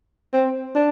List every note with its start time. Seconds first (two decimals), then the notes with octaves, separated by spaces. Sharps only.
0.33 C4
0.75 D4